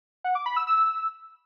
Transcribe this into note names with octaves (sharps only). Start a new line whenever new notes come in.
F#5
D6
B5
E6
E6